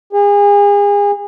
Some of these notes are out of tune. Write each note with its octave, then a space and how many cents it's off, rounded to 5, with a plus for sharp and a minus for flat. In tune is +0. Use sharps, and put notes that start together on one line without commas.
G#4 -35